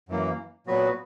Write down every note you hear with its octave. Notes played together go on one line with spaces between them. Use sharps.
F#2 E3 A#3
A#2 F#3 B3 F#4 B4